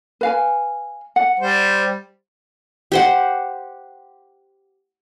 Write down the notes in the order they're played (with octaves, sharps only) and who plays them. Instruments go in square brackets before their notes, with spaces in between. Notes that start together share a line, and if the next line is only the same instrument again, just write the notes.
[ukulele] B4 F5 G#5
F#5
[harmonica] G3 C5
[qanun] G4 C5 F#5